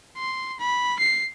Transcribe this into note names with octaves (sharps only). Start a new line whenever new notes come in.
C6
B5
C7